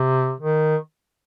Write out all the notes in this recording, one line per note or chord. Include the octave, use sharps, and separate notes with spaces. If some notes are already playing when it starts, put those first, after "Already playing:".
Already playing: C3
D#3